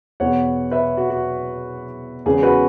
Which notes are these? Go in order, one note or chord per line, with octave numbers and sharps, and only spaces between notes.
E2 B2 B3 C#5 F#5
B4 E5
F#4
F#4
E2 C#3 G#3 B3 G#4
F#4 B4